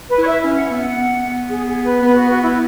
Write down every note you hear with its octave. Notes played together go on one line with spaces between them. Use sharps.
B4
E4 C#5
E5
C#4
F#5
B3 E5
F#5
B3
G#4
G#4
B4
B3 B4
F#4
F#4
E4